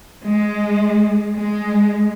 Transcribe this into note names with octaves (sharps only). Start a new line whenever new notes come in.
G#3
G#3